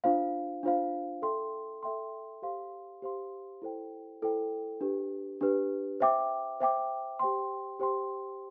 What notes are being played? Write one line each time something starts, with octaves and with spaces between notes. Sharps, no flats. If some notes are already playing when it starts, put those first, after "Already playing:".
D4 F4 C5 F5
D4 F4 C5 F5
A4 E5 G5 C6
A4 E5 G5 C6
G4 C5 F5 C6
G4 C5 F5 C6
E4 A4 C5 G5
E4 A4 C5 G5
D4 G4 B4
D4 G4 B4
C5 E5 G5 D6
C5 E5 G5 D6
G4 C5 G5 C6
G4 C5 G5 C6